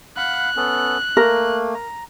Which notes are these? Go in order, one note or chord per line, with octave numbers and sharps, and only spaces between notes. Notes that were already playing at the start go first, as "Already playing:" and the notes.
F5 F#5 B5 F#6
B3 C#4 A4
A3 A#3 A#4
A#5